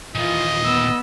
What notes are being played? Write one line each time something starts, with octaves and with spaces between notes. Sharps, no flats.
D#2 A#2 E3 F4 D#5
B3 E6